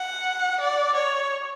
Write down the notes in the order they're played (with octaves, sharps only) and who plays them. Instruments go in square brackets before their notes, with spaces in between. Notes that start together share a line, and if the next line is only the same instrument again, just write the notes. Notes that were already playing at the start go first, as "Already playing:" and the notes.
Already playing: [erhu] F#5
D5
C#5